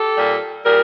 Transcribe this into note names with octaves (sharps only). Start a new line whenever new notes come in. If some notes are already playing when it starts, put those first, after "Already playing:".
Already playing: G4 A4
A#2 G3
A#2 G3 G#4 A#4